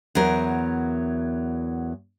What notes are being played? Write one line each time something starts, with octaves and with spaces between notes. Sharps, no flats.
E2 F#3 A#4